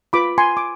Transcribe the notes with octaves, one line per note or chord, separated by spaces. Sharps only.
F4 B4 B5 D6
G#5 C6
D6